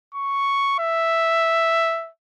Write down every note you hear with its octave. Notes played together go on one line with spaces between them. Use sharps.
C#6
E5